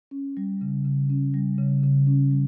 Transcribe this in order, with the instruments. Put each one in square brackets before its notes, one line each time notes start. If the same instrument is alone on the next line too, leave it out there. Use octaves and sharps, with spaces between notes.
[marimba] C#4
G3
C#3
C#3
C#4
G3
C#3
C#3
C#4
G3